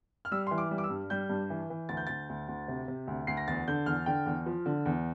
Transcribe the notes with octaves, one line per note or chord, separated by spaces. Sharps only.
F6
G3 E6
E3 C6
D6
G3
D6
E6
G2
G3 G6
G2
E3
E3
D2 A6
G6
D2 A6
D2
D2
C3
C3
D2
D2 C7
A#6
E2 A6
D3 G6
E2 F6
D3 G5
E2
F3
D3
E2